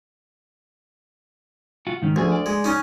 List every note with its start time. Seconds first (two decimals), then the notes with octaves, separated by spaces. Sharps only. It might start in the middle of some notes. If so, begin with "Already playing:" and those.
1.87 F4 F#4
2.02 G#2 D#3 C#4
2.16 D2 F3 G#4
2.32 D5
2.46 G#3
2.64 C#4 D#4